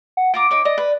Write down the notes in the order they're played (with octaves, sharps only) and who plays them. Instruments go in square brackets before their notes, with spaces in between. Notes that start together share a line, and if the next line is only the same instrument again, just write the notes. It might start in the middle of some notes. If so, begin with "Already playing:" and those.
[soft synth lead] F#5
[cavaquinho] F4 A#5 D6 [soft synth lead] D7
[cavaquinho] D#4 C#5 D6
[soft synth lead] D5 [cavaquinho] D#5
[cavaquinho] B4